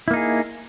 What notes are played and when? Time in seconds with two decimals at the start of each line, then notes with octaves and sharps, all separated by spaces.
0.08 E4
0.11 A#3
0.13 D#4
0.16 G#4